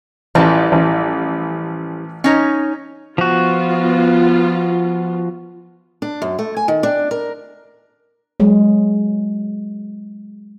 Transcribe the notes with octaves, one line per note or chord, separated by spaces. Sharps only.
A1 E3 F3 G3 A5
A1
C#4 D#4 C#5
F3 B3 F4 F#4
D4
F#2
A3
G#5
D#3
D4
A#4
F#3 G#3